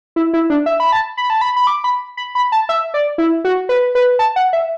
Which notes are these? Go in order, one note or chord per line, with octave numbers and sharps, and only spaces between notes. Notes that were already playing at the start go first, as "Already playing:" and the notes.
E4
E4
D4
E5
B5
A5
B5
A5
B5
B5
D6
B5
B5
B5
A5
E5
D5
E4
F#4
B4
B4
A5
F#5
E5